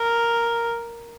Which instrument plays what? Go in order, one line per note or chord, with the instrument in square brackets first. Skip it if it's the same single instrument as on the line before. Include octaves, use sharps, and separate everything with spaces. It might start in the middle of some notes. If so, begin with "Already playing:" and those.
Already playing: [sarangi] A#4